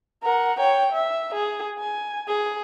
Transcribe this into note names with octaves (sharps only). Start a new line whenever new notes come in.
A#4 F#5
C#5 G5
E5
G#4
G#5
G#4